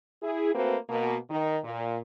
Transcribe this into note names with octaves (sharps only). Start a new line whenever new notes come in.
E4 G#4
A3 A#3 C4 F#4 B4 C5
B2 A#3
D#3
A#2